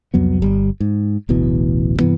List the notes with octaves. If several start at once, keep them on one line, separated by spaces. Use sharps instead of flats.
C2 F2 F#3 B3
G1 G3
G#2
D1 A1 B2 E3
G2 C3 E3 B3